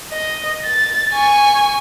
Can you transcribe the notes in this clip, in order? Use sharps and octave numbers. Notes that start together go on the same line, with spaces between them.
D#5
A6
G#5 C#6